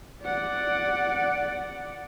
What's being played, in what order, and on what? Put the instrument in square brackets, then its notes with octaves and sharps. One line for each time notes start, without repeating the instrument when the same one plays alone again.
[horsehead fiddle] D5 F#5